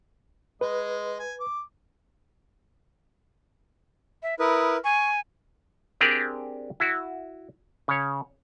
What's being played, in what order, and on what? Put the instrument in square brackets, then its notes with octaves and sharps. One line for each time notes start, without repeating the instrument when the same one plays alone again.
[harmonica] G#3 D#5 [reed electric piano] B4
[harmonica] G#5
D6
[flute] E5
[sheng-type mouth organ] E4 A#4 B4 [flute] D#6
[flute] G#5 [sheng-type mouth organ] C#6
[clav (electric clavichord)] C4 D4 G4 G#4 A#4 D5
E4 F#4
C#3 C#5